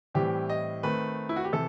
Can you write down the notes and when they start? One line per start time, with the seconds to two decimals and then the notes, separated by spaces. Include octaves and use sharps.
0.14 A2 E3 G3 C4 G4
0.50 D#5
0.83 D#3 A3 C4 B4
1.29 E4
1.36 F#4
1.44 G4
1.52 C3 E3 A4